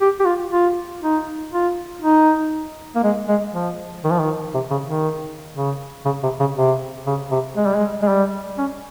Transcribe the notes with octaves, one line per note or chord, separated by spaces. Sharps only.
G4
G4
F4
F4
D#4
F4
D#4
A#3
G#3
G#3
F3
D#3
F3
D#3
C3
C#3
D#3
C#3
C#3
C3
C#3
C3
C#3
C3
G#3
G3
G#3
G#3
G3
C#4